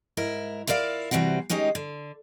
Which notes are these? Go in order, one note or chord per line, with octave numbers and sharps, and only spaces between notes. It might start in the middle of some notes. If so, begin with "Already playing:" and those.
G#2 E4 A#4
E4 F4 A#4 D5 F5
C3 E3 G3 C4 F#4
D#3 G#3 C#4 D#4 G4
D3